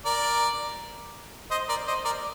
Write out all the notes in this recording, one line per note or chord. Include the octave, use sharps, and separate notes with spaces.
A#4 D5
C5 D#5
A#4 D5
C5 D#5
A#4 D5